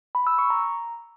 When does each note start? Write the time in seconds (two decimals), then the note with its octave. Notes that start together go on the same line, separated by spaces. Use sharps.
0.15 B5
0.27 E6
0.38 C#6
0.50 A#5